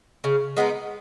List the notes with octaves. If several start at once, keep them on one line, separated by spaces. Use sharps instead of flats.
C#3
G#3 B3 D#4